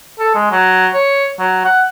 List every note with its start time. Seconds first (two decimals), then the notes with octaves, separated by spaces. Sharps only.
0.19 A4
0.35 G#3
0.52 F#3
0.94 C#5
1.39 F#3
1.65 F#5